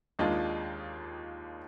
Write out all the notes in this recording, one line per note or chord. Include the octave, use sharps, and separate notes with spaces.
D#2 D#3 G#3 D4 F4